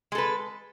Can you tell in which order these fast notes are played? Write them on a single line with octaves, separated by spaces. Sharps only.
G#3 A4 B4